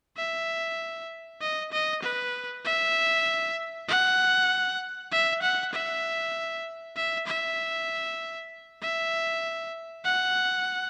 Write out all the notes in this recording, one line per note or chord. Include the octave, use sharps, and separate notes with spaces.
E5
D#5
D#5
B4
E5
F#5
E5
F#5
E5
E5
E5
E5
F#5